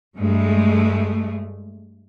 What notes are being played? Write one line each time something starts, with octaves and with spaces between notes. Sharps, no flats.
G2 G#3 A3